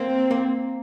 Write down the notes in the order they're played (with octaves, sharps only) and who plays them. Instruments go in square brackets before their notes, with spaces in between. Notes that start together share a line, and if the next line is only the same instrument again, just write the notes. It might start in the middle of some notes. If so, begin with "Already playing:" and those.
Already playing: [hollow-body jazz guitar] A#3 [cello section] C4
[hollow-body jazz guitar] A#3